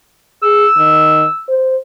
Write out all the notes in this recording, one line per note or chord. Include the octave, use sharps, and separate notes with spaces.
G#4 E6
D#3
C5